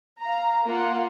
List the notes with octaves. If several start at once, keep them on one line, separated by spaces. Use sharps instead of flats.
F5 A#5
A#3 F4 F#5